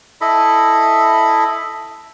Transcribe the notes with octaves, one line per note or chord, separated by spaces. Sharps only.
E4 A4 D#5 B5